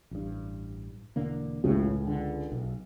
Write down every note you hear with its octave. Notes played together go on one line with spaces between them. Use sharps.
A1 G2
E1 D3 A#3
G#1 C#2 A2 C#3
D3
B1